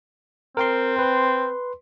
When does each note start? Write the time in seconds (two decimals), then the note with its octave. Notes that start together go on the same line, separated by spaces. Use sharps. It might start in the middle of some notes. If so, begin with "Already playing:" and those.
0.57 C4 A#4 G5 C6
0.99 B4 C6